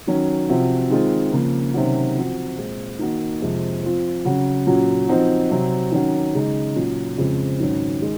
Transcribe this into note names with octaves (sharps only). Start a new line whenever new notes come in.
D#3 F#3 C#4
C3 F3 C4 F#4
D#3 G#3 C4 F4
C#3 F3 A#3
C3 D#3 F#3 C#4 F#4
F3 C4 F#4
A#2 G#3 C4 F4
D#3 A#3 D#4 F#4
F2 C3 F3 G#3
F3 C4 F4
C#3 F#3 C#4 F#4
A#2 F#3 C#4 F#4
F3 C4 D#4 F#4
C3 F#3 C4
D#3 F#3 C#4 F#4
C#3 G#3 D#4
A#2 F#3 C#4
F2 C#3 G#3 C4
G#2 D#3 F#3 C#4
D#3 G#3